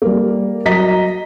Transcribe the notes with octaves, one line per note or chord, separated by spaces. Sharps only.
G3 A#3
F#3 D#5 A#5 B6